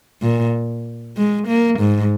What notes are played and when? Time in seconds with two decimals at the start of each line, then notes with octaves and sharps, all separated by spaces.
0.22 A#2
1.17 G#3
1.48 A#3
1.80 G#2